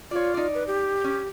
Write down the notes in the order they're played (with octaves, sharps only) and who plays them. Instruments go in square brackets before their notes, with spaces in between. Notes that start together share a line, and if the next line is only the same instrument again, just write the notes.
[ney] F4 [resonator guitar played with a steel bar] C#5 D5
[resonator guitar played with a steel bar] D#4 D5
[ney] B4
G4
[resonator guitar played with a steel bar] C#4